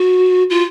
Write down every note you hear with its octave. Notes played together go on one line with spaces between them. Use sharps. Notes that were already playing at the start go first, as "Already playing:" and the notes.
Already playing: F#4
F4